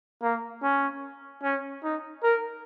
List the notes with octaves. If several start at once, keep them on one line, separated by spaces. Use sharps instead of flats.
A#3
C#4
C#4
D#4
A#4